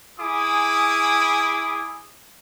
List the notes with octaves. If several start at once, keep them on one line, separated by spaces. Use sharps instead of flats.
E4 G#4 G#5 D6 D#6